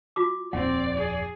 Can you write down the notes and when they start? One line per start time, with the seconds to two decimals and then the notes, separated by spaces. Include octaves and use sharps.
0.16 F4 F#4 D6
0.53 D#1 F2 C4 D5 F#5
0.96 G#4